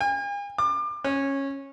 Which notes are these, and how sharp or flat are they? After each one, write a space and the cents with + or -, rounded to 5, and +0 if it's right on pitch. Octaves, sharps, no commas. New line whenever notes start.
G#5 -45
D6 +30
C#4 -15